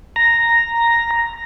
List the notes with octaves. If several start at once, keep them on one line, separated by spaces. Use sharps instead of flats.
A#5